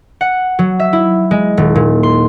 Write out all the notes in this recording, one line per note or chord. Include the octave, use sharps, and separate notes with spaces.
F#5
F#3
E5
E4
G#3
D#1
A#2
C6